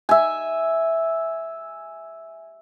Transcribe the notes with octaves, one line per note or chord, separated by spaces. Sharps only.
E5 G#5